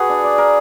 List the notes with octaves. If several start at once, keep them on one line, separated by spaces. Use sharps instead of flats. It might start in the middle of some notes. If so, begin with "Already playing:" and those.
Already playing: F#4 G#4 B4
D4
D5
A#4